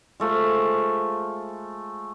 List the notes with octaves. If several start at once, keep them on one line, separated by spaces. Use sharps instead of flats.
G#3 A3 F4 C5